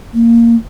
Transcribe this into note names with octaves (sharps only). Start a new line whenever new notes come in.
A#3